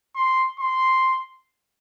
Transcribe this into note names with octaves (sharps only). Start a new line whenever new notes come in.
C6
C6